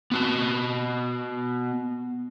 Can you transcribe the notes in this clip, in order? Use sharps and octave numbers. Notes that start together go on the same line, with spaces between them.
B3 F#4 A5